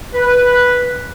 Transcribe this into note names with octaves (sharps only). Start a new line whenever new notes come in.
B4